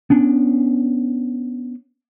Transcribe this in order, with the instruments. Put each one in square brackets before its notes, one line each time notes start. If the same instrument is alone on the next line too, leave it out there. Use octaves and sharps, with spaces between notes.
[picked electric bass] B3 C#4 D4